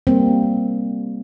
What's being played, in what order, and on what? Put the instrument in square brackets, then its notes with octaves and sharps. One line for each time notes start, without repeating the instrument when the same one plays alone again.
[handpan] G3 A#3 C4